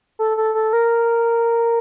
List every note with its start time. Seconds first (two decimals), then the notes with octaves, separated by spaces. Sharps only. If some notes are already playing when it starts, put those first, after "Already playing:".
0.19 A4
0.37 A4
0.54 A4
0.73 A#4